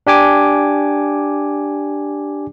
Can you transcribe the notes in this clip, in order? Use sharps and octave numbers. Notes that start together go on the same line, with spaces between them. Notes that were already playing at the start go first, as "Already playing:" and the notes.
D4 G4 G#5 D6